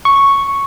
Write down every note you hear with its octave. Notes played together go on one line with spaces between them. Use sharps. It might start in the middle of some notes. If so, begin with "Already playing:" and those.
C#6